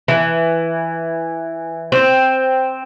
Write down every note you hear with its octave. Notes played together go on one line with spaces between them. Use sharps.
E3
C4